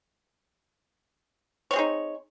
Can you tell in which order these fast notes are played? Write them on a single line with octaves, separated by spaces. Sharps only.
C#5 C4 G#4 D#4